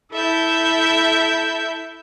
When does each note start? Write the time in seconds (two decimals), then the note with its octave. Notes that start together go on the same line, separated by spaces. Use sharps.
0.12 E4 A4 E5 G6